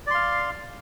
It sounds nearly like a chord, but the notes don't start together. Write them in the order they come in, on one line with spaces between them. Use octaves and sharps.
D5 C6 F5